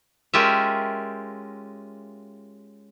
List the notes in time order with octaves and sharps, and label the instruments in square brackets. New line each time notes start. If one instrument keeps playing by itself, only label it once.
[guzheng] G#3 C#4 F4 G4 A#4 E5